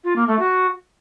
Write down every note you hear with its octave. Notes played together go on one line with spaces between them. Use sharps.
F4
A#3
A3
F#4